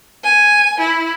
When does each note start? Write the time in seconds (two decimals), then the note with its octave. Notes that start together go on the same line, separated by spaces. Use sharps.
0.23 G#5
0.79 E4